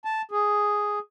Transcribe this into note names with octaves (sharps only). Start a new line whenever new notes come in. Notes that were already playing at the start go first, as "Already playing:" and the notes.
A5
G#4